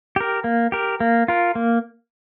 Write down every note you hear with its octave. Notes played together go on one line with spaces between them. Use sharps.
G4 A#4
A#3
G4 A#4
A#3
F4 A#4
A#3